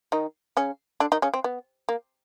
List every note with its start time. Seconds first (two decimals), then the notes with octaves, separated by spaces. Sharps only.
0.12 D#3 D#4
0.57 C#3 C#4
1.00 D3 D4
1.12 D#3 D#4
1.22 C#3 C#4
1.34 C4
1.44 B3
1.89 A#3